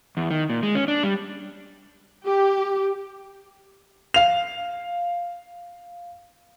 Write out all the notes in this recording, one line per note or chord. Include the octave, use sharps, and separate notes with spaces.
E2
D#3
A#2
G#3
C#4
D4
G3
G4
F5 F7